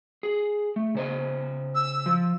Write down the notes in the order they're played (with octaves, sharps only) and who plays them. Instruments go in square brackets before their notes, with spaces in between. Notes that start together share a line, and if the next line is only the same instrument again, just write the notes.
[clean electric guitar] G#4
A3
C#3 C5 D#5
[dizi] E6
[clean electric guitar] F3